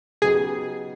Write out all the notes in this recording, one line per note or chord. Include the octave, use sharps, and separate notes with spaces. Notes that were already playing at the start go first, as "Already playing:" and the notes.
C#3 F#3 B3 D#4 G4 G#4